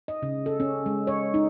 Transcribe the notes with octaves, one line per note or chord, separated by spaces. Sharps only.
D#5
C#3
A4
C#4
G#3
C#5
D#4